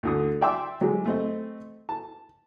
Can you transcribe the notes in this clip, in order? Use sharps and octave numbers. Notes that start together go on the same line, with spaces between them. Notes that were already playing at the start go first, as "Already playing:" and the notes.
D2 D3 D#6
D5 E5 G5 C6 D6 E6
F#3 G#3 G4
A3 C4 D#5
A5